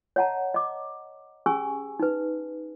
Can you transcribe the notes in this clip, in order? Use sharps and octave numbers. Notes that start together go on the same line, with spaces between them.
C#5 D#5 F#5 A5 A#5
D#5 D6
C#4 G4 G#4 G#5 C#6 E6
D#4 B4